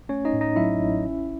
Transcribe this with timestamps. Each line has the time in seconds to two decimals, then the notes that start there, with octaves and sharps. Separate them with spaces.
0.09 A3 C#4 C#5
0.25 D#4 D#5
0.33 A2
0.41 D#4 D#5
0.56 F#3 E4 E5
0.80 A1
1.04 C#4